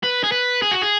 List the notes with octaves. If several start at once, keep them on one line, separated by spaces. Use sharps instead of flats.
B4
G#4
B4
G#4
F#4
G#4